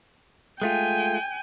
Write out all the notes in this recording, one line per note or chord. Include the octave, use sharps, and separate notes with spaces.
G#3 A3 F4 G5 G#5